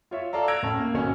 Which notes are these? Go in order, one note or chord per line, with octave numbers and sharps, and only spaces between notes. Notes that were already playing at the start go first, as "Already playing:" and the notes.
F4 C#5 E5
A4 D5 F5 A#5
E6 F#6 G#6 A#6 D7 F7
A2 C#4 A5
A#3
G#1 B2 C#4 G#5